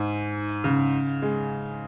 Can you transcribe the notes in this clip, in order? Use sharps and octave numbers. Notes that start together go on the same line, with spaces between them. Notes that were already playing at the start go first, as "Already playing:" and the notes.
Already playing: G#2
C#3
G#3